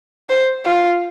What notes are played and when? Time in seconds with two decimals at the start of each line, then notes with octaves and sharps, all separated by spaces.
0.30 C5
0.65 F4